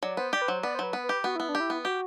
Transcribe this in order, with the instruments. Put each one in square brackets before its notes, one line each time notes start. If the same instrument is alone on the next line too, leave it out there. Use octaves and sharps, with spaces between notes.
[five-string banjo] F#3 [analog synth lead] D5
[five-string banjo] B3 [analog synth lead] C5
[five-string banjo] G4 [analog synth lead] D5
[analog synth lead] B4
[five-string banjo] F#3 [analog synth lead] C5
[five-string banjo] B3 [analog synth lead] D5
[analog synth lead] C5
[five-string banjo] F#3 [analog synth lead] B4
[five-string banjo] B3
[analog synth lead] B4
[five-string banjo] G4
[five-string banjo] B3 [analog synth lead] F#4
[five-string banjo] B3 [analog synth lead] E4
[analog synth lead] D4
[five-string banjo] G4
[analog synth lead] E4
[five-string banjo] B3
[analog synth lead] F#4 [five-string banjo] G4